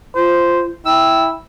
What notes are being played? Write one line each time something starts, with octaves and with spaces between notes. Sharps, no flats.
F4 C5
E4 G5 E6